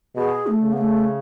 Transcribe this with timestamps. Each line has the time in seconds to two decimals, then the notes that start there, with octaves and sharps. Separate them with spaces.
0.16 B2 G#4
0.47 A3
0.62 C#3
0.73 B3
0.77 A3